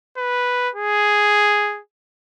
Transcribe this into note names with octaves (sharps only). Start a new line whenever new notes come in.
B4
G#4